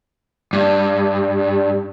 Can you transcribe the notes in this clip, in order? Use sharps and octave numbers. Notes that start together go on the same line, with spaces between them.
G2